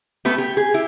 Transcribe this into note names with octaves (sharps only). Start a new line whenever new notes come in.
A3 B3 G4 B4
G4
G#4
E4 G4